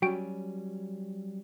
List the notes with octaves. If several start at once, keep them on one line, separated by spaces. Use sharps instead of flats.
F#3 G3 C#4 F#4 G5 D7